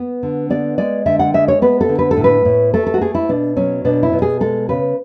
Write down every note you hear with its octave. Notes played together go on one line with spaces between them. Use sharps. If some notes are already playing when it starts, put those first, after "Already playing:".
Already playing: B3
D3
B3 D5
G#3 D5
D3 E5
F#5
G#3 E5
C#5
B3 B4
A4
D3
B4
A4
A2
B4
A2
A3 A4
A4
F#4
A3 G#4
E4
B2 D4
F#3 C#4
B2 D4
E4
B2
G#4
G#3 A4
C#3 B4